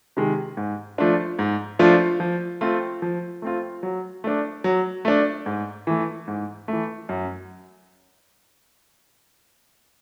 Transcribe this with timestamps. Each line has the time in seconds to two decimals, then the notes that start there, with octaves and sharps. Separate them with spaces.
0.17 C3 D#3 G#3
0.57 G#2
0.98 F3 A3 D4 F4
1.39 G#2
1.79 F3 A3 D4 F4
2.20 F3
2.61 A3 C4 F4
3.02 F3
3.42 A3 C4 F4
3.83 F#3
4.24 A3 D4
4.64 F#3
5.05 A3 D4
5.46 G#2
5.87 E3 A3
6.28 G#2
6.68 E3 A3
7.09 F#2